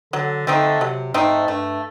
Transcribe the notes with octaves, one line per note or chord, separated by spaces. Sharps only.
D3 F#3
D3 A3 C4 D#4
C3 F#3
G#2 A3 C4 D#4
G2 A3